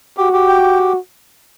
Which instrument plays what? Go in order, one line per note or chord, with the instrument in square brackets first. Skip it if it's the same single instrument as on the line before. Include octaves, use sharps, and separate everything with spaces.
[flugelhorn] F#4 [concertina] G4
[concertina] G4
G5
G4